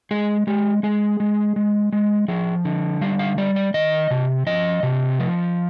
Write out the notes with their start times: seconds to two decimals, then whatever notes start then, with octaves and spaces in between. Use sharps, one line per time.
0.11 G#3 G#4
0.47 G#3 G4
0.83 G#3 G#4
1.20 G#3
1.56 G#3
1.93 G#3
2.28 F3 G#4
2.65 D3
3.01 G3 F5
3.19 F5
3.38 G3 D5
3.56 D5
3.74 D#3 D#5
4.11 C3
4.47 F3 D#5
4.83 C3
5.19 F3